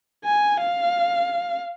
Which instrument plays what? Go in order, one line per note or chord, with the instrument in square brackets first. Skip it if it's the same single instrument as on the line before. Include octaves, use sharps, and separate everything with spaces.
[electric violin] G#5
F5